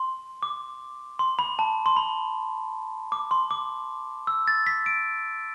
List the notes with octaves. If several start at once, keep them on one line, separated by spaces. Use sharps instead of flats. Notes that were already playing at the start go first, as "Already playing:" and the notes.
Already playing: C6
D6
C6
B5
A5
C6
B5
D6
C6
D6
E6
A6
B6
D7